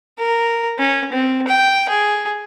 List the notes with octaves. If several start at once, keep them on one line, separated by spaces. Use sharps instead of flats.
A#4
C#4
C4
G5
G#4